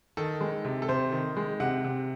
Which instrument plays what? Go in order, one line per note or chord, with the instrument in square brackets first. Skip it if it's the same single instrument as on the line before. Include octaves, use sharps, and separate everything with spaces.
[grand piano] D#3 A4
G#3
C3
A4
C3 C5
D#3
G#3
C3 F#5
C3